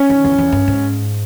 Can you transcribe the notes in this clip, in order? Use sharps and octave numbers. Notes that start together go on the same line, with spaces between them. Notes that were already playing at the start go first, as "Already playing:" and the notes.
Already playing: C#4
D#3
E2
E2
G2
G#2